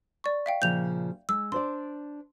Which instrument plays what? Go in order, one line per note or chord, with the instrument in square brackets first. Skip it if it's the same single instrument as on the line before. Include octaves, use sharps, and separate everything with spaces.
[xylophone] D5 C#6
E5 F5 G5
[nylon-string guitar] A#2 C#3 F3 [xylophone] G6 F7
[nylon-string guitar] G#3 [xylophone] E6
[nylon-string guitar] D4 C5 D5 [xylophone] C6